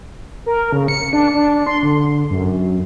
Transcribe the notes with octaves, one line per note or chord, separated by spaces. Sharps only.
A#4
C#3
C#7
D4
D4
C6
D3
F#2